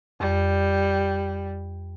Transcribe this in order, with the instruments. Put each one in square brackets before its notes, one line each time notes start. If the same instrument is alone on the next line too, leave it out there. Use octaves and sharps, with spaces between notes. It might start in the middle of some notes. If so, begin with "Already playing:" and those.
[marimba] F2 [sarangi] G3